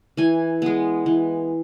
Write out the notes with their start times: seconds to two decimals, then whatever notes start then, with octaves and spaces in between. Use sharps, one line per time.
0.17 E3 G#5
0.62 G#3 B3
1.06 E3